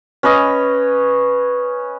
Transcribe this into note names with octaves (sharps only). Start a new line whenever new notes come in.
C#4 B4 C#5 D#5